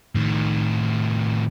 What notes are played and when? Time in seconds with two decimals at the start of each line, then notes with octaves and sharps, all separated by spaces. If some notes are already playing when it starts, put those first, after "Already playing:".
0.15 A2 D#3